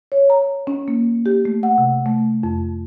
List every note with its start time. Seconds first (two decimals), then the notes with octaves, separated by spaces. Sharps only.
0.12 C#5
0.30 A#5
0.67 C#4
0.88 A#3
1.26 G4
1.45 A3
1.63 F#5
1.78 C3
2.06 A3
2.43 F2